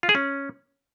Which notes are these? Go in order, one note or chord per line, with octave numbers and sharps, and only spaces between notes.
F4
G#4
C#4